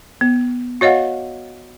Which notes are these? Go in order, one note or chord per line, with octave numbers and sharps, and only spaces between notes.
B3
F#4 C#5 D#5 F5 F#5